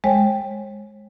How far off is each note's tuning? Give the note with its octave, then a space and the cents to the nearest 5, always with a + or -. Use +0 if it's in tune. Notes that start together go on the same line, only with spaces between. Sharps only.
G#3 +0 C#5 -40 G5 +0